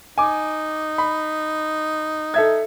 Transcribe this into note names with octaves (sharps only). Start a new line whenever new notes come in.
D#4 G#5 D6
B5
A4 E5 G#6